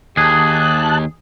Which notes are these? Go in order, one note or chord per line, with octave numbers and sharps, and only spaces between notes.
D#2 G4 G#4 A5 D#6 F#6